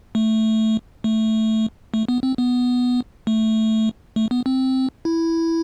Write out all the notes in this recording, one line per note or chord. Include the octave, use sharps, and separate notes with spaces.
A3
A3
A3
B3
C4
B3
A3
A3
B3
C4
E4